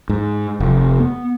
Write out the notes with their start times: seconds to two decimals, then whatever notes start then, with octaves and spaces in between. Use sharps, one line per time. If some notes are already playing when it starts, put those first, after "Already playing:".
0.09 G#2
0.60 F1
1.00 B3